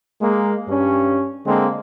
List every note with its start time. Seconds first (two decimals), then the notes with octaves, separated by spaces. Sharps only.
0.22 G#3 A#3
0.68 G2 C#4
1.47 D3 G#3 A#3 C4